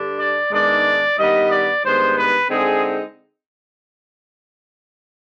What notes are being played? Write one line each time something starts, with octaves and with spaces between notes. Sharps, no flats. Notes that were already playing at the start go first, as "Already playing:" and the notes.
Already playing: G2 D3 G3 D4
D5
G#2 D#3 G#3 B3 D4 D5
G2 D#3 G3 B3 D#5
D5
G2 D#3 G#3 B3 C5
B4
D3 G#3 C4 D#4 G#4